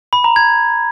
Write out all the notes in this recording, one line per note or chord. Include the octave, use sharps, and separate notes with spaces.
B5
A#5
G#6